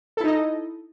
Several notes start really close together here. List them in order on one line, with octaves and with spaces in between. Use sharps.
A4 E4 D#4 D#5